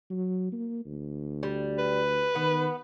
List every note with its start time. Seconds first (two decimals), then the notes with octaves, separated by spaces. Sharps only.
0.10 F#3
0.52 A#3
0.86 D2
1.43 G3
1.78 B4
2.35 D#3 B3